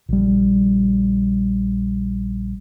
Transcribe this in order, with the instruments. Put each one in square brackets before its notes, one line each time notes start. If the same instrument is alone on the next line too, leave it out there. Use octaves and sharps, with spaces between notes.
[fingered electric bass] A#1 G3